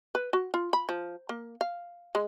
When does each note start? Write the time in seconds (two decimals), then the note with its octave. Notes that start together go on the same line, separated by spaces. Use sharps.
0.15 B4
0.33 F#4
0.54 F4
0.73 B5
0.89 F3
1.29 A#3
1.61 F5
2.15 G#3